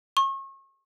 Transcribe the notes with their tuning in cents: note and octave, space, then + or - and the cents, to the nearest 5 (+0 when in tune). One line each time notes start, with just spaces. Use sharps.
C#6 -35